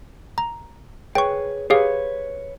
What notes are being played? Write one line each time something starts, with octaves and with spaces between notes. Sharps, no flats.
A#5
G#4 B4 C#5 G5 C#6
G4 G#4 B4 C#5 F5